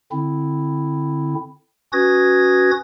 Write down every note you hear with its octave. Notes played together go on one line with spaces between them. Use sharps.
D3 C4 E4
C#4 F#4 B4 D#6 G#6 A#6